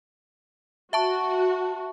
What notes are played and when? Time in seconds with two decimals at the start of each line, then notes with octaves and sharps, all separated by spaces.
0.93 F#4 E5 A5 C#6